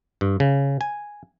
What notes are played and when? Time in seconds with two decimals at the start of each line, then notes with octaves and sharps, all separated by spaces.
0.21 G2
0.40 C#3
0.81 G#5